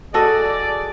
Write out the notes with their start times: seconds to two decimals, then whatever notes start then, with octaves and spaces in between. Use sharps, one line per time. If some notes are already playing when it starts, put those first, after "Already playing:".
0.14 F#4 G#4 A4 D5 D#5